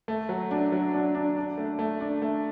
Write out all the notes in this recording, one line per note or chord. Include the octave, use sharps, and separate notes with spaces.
A3
F#3
D4
F#3
D4
D4
D4
A3
A3
D4
A3